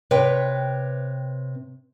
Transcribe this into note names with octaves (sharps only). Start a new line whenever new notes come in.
C3 B4 C#5 G5